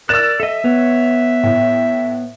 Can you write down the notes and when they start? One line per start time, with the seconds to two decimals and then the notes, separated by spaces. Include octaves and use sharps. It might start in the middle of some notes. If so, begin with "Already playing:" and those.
0.09 A#4 D5 E6 F#6 E7
0.40 A4 D#5 E5
0.64 B3 C#5
1.43 A2